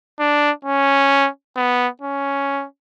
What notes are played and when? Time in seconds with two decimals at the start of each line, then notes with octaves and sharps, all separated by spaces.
0.19 D4
0.65 C#4
1.56 B3
2.02 C#4